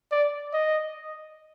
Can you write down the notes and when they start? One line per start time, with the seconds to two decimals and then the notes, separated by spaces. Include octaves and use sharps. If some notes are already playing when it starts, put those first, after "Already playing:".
0.12 D5
0.53 D#5